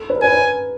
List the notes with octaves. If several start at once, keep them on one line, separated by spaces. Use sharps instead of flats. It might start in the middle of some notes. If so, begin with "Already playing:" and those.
Already playing: A4
B4
A#4
B4 G#5
B4